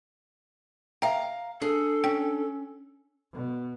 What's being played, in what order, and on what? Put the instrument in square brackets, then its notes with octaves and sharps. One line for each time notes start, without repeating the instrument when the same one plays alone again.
[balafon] E5 G5 [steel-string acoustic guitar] F5 A#5
[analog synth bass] D4 [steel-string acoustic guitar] G#4 [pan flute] A4
[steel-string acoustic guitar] C#4 [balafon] G5
[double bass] B2